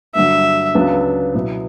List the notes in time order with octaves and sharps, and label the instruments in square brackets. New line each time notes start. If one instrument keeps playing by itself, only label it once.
[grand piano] G2 D3 F#3 [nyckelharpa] E5
[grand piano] C#2 C#3 F#3 B3 D4
B2 F#3 B3 E4